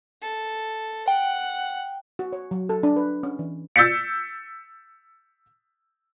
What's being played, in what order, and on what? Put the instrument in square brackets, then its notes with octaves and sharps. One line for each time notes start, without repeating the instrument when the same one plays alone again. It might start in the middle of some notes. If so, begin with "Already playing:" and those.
[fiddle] A4
[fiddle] F#5 [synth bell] G5
[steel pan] F#4
C#5
F#3
A4
D4
B4
C#4
E3
[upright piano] E6 G6 A6 B6 C#7